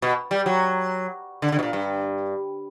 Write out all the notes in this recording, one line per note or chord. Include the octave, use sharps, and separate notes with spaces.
B2
G3
F#3
D3
D3
B2
A#2
G2